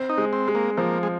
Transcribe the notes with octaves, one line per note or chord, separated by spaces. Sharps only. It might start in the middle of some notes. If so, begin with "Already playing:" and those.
Already playing: C4
D#4
G#3
C4
G#3
A#3
F3 A#3
G#3